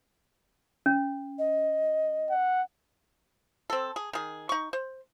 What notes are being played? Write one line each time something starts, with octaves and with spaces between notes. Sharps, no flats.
C#4
D#5
F#5
C4 A4
G#4
D#3 G#4
D#4 C#6
C5